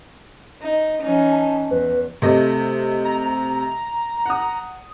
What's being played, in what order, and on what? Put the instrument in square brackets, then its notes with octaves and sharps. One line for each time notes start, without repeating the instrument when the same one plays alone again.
[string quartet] D#4
E3 C#4 D#4
[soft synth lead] A5
[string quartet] E2 [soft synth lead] B4
[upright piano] C3 A3 D#5
[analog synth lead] A#5
[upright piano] F#5 D#6